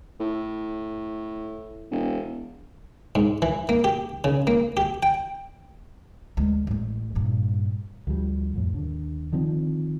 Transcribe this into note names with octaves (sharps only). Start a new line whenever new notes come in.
A2
E1
G#2
E3
A#3
G4
C#3
A#3
G4
G5
D2 G#3
A1 A3
G2 A#2
D2 F3 G3
F2 A2
D#2 D3
D3 D#3 F3 C4